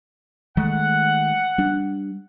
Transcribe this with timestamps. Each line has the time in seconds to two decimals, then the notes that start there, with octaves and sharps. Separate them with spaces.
0.57 D#3 G#3 A3 F#5
1.58 G3 D4